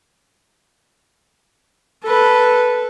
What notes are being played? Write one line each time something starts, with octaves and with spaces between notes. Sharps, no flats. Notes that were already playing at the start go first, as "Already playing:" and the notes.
A4 B4